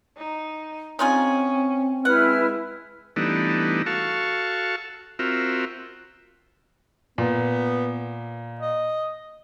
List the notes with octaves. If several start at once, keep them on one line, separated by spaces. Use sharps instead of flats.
D#4
C4 C#4 D#4 F4 G#4
G#3 E4 B4 F#5 F6
E3 G3 A3 B3 D4 D#4
F#4 A4 F5 A5 C#6
C4 F4 F#4 A#4 E5
A#2 B3
D#5